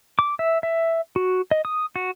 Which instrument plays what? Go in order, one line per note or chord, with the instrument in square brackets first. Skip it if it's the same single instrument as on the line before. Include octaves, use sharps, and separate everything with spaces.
[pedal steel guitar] D6
E5
E5
F#4
D#5
D#6
F#4